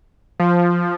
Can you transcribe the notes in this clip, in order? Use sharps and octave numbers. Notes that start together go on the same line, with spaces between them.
F3